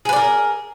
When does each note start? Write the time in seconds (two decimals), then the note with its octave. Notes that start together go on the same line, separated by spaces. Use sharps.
0.05 G#4
0.09 B4
0.13 D5
0.16 A#4